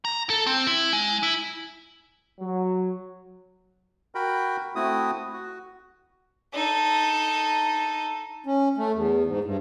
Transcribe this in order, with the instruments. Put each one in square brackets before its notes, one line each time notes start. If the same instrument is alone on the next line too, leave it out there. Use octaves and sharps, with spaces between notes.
[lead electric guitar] A#5
A4
C4
E4
G#3
E4
[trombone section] F#3
[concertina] F#4 A#4 G5 B5
A3 C4 E4 F#4 D#6
F#4
[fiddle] D#4 A4
[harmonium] C#4
A3
E2
G#2
G2